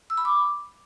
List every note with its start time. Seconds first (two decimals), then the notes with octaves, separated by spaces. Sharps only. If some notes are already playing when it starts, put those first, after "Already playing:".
0.10 E6
0.18 B5
0.25 D6